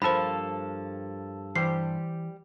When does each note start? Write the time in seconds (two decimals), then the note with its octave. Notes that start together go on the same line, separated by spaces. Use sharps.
0.02 G2 F3 A#3 A4 C5 B5
1.56 E3 G3 G4 C5 C7